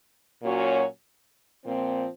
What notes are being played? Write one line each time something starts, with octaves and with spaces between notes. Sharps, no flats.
A#2 F#3 C#4 F#4 C#5
A#2 F3 C4